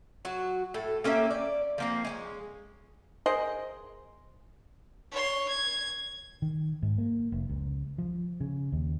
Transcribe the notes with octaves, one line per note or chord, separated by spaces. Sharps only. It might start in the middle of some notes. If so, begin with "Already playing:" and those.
F#3 F#4
A2 A4
A#3 C#4 G4 E5
D5
F3 A#3 C4
G#3 C4 C#4
G#4 A#4 C5 D#5
C#5 C6
G#6
D#3
G#2
A#3
F1
C#2
F3
C#3
D#2